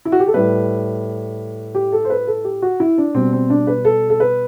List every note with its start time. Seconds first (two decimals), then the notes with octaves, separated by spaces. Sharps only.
0.05 E4
0.12 F#4
0.20 G4
0.27 A4
0.34 A2 G3 B4
1.75 G4
1.92 A4
2.05 C5
2.10 B4
2.27 A4
2.44 G4
2.62 F#4
2.80 E4
2.98 D4
3.15 B2 G3 C4
3.33 C4
3.50 D4
3.67 B4
3.85 A4
4.10 A4
4.20 B4